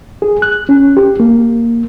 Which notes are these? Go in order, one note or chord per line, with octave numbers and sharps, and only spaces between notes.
G#4
F#6
C#4
G4
A#3